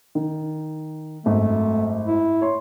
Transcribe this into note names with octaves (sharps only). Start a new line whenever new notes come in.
D#3
G#1 F#2 A3
E4
C#5 C6